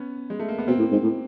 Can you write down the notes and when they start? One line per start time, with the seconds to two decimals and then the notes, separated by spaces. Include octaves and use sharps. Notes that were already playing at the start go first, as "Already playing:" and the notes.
Already playing: B3 C#4
0.30 G#3
0.40 A3
0.48 A#3
0.58 B3
0.68 B2 A#3 C4
0.79 A2
0.92 G#2
1.03 A2